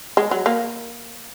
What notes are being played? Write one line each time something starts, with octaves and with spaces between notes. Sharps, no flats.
G#3
F#3
A#3